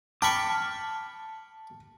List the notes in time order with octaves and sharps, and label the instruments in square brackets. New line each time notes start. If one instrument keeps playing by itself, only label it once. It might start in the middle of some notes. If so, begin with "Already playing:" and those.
[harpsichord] G5 B5 C#6 [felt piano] A5 [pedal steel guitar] D6 F6